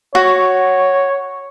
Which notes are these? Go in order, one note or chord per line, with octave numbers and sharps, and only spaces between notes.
F#4 C#5